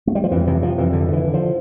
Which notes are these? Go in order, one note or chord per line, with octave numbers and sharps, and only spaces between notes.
A3
G3
F3
F2 E3
C3 E3
C3 F3
F2 E3
G2 D3
D3 E3
D3
F3